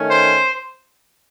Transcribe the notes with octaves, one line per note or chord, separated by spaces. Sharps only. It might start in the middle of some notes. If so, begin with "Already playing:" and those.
Already playing: D#3 A3 C#4
C5